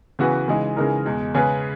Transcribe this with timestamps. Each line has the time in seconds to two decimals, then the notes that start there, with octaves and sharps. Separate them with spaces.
0.19 C#3 E3 B3 F#4 B4
0.48 C#3 E3 G#3 D#4
0.77 C#3 E3 G#3 D#4 A#4
1.06 E2 B2 G#3
1.35 C#3 G#3 C#4 G#4 B4